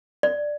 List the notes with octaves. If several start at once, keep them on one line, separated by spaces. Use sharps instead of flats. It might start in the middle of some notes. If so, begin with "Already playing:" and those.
D5